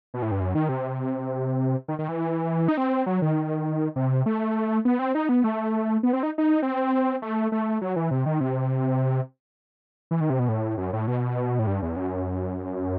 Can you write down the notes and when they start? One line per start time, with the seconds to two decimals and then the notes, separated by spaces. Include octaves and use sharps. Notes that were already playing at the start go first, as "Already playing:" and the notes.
0.14 B2
0.22 A2
0.31 G2
0.40 F#2
0.55 D#3
0.69 C3
1.88 D#3
1.99 D#3
2.09 E3
2.68 D#4
2.77 C4
3.06 F#3
3.22 D#3
3.96 C3
4.26 A3
4.85 B3
4.99 C4
5.15 D#4
5.29 B3
5.44 A3
6.03 B3
6.13 C4
6.23 D#4
6.38 D#4
6.62 C4
7.22 A3
7.52 A3
7.81 F#3
7.96 E3
8.11 C3
8.26 D#3
8.40 C3
10.11 E3
10.20 D#3
10.30 C3
10.39 B2
10.49 A2
10.78 F#2
10.93 A2
11.07 B2
11.59 A2
11.67 G2
11.82 E2
11.96 F#2